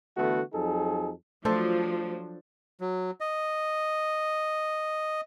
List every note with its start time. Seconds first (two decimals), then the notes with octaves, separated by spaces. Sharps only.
0.17 D3 E3 A3 B3 F#4
0.53 F2 F#3 D#4 G#4 A4
1.45 F3 F#3 A3 D4 A4 C5
2.81 F#3
3.20 D#5